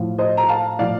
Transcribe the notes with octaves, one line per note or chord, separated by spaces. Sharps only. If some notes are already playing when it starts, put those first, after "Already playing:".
Already playing: A2 F3
C5 D#5
A#5
F5 A5
A2 F3 D5 F5